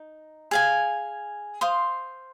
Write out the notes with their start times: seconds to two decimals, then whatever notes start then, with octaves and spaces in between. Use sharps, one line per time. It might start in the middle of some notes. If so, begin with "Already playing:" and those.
Already playing: D#4
0.51 G#4 F5 G#5
1.61 C5 F5 C6 D#6